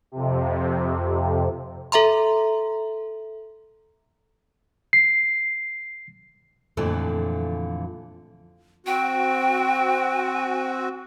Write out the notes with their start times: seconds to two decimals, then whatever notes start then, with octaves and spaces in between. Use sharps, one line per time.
0.12 F2 C3
1.92 A4 E5 A#5 C6
4.93 C7
6.77 F2 A#2 D3 E3 F3 A3
8.86 C4 F#4 G5